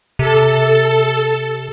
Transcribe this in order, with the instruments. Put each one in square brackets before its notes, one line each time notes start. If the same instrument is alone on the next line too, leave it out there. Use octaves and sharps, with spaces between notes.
[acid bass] C3 [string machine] A4